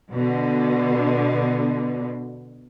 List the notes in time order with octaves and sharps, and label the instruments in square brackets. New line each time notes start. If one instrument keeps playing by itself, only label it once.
[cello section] B2 D3